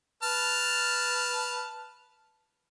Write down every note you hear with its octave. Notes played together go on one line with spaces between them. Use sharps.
B4 A5 F6